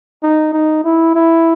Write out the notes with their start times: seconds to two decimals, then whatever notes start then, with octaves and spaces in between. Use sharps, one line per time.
0.23 D#4
0.53 D#4
0.84 E4
1.15 E4